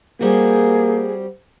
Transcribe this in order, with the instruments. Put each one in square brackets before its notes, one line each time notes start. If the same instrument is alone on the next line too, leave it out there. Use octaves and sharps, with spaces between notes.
[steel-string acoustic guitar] G3 C4 F#4 [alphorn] A#3 [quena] G#4